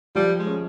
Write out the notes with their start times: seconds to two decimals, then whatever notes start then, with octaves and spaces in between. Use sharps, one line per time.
0.15 F3 G3
0.39 G#3
0.47 C#4